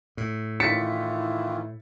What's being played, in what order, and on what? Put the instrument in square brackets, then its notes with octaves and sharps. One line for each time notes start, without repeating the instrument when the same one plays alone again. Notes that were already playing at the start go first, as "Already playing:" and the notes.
[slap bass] A2
[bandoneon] D#3 E3 F4 [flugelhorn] E4 [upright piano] A6 B6 C#7